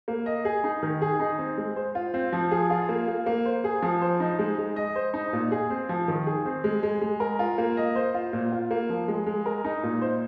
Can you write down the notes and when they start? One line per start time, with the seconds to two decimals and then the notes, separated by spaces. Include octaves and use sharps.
0.08 A#3
0.26 D#5
0.45 G#4
0.64 D#4
0.83 D#3
1.02 G#4
1.20 D#4
1.39 C4
1.58 G#3
1.76 C5
1.95 F4
2.14 C4
2.32 F3
2.51 G#4
2.70 F4
2.89 A#3
3.08 A#3
3.26 A#3
3.46 C5
3.64 G#4
3.82 F3
4.02 C5
4.20 D#4
4.39 G#3
4.58 G#3
4.76 D#5
4.96 C5
5.14 D#4
5.33 A#2
5.52 G#4
5.70 C4
5.89 F3
6.08 D#3
6.27 G#4
6.45 C4
6.64 G#3
6.83 G#3
7.02 G#3
7.20 A#4
7.39 F4
7.58 A#3
7.77 D#5
7.95 C5
8.14 F4
8.33 A#2
8.52 F4
8.71 A#3
8.89 F3
9.08 G#3
9.27 G#3
9.46 A#4
9.64 D#4
9.83 A#2
10.01 C5